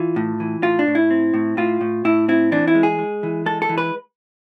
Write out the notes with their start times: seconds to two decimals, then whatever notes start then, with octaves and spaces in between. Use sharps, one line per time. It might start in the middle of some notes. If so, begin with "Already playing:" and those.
Already playing: E3 F4
0.16 A2
0.40 E3
0.63 A2 F4
0.79 D4
0.87 A2
0.95 E4
1.10 C4
1.34 A2
1.57 A2 F4
1.81 A2
2.05 A2 E4
2.28 C4 E4
2.52 E3 D4
2.68 E4
2.75 G#3
2.83 G#4
2.99 G#3
3.23 E3
3.46 G#3 A4
3.62 A4
3.69 E3
3.78 B4